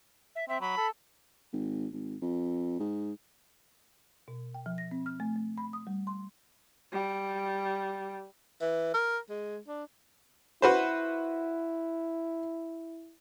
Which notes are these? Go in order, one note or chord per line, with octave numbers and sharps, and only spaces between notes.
E5
C4 E5
F#3 B5
A4
G#1
G#1
F2
G#2
B2
G5
F3
A#6
C4
F6
A3
A3
B5
D#6
G3
C6
G3
E3
A#4
G#3
D4
E4 F#4 B4 C5